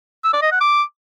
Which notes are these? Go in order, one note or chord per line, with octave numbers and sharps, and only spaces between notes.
E6
D5
D#5
F#5
D6